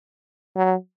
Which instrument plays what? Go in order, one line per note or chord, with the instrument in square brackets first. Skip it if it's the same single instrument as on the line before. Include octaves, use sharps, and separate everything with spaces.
[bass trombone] F#3